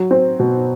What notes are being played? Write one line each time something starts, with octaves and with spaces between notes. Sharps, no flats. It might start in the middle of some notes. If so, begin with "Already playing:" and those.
Already playing: F#3
C4
B2